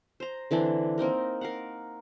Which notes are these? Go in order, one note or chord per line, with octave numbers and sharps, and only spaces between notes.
C5 A#5
D3 E3 C4 D4
A#3 C4 D#4 A#4
A#4 F5 F#5